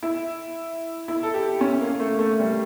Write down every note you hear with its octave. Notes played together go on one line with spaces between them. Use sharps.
E4
E4
A4
G4
C#4
A#3
A3
A3
G3